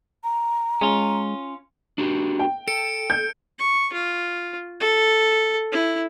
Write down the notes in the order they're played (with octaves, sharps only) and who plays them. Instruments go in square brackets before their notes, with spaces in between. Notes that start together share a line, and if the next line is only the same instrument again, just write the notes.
[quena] A#5
[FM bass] G#3 [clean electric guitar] C#4 F4
[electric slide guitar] D4 F#4 G4
[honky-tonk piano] G5
[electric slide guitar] A4 [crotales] C#7 D7
[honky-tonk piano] G6
[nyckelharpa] C#6
F4
A4
E4